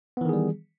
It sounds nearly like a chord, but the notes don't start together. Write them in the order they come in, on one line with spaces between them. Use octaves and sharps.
B3 E3 D#3 G#4 G3